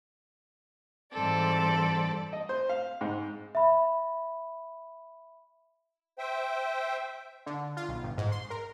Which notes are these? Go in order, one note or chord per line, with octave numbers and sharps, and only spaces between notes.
G#2 E3 G3 C4 A4 D5
D#5
C5
F5
G#2
E5 B5
C5 E5 G5
D3
F4
B1
G1
G#2
C6
A#4